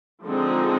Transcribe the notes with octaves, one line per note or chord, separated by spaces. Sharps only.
D3 F3 G#3 C4 D#4